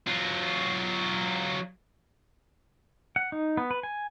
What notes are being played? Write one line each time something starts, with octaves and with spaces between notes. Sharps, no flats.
F#3 F4
F#5
D#4
B3
B4
G#5